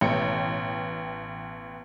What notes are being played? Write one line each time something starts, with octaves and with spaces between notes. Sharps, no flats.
A1 B2 G5 C#7